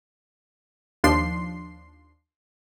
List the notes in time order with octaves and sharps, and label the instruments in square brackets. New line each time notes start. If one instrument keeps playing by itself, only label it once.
[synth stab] D#2 F3 D4 C6 C7